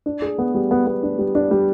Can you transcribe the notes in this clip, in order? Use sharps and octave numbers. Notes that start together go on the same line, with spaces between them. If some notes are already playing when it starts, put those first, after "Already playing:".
D4
G#4
B3
G3
B3
B3
D4
G3
D4
G3